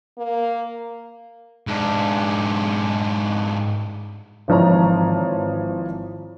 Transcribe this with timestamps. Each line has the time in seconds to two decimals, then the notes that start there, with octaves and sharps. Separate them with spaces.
0.18 A#3
1.67 G#2 D4
4.48 G#1 E3 F3 C#5 A5 A#5